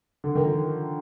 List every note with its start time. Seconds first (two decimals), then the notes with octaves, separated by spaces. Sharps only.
0.24 D3
0.35 D#3
0.47 F3